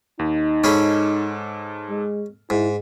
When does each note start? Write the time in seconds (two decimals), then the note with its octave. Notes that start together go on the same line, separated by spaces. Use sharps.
0.19 D#2 D#4
0.64 G#2 C#4 G#4 A4 B5
1.90 G#3
2.50 G#2 E4